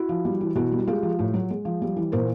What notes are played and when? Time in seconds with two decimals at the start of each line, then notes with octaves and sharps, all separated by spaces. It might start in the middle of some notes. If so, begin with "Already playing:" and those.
Already playing: E4 F#4
0.09 F3
0.25 G3
0.41 E3
0.55 B2 E4 F#4
0.72 G3
0.87 G#3 F4 G4
1.03 F3
1.19 A2
1.34 F#3
1.50 G#3
1.65 F3
1.82 G3
1.96 E3
2.12 A#2 A#4 C5